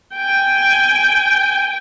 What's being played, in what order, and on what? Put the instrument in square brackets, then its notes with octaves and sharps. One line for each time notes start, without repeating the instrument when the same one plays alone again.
[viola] G5 G#5